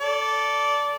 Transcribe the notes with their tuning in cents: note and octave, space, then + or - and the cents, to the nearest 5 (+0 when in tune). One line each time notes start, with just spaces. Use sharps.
A4 +0 D5 -15